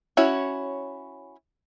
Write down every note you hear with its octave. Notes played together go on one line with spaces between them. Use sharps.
C#4 E4 F#4 C#5